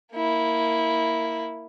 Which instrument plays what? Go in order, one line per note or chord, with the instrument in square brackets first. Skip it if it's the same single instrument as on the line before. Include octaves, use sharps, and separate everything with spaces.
[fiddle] A#3 E4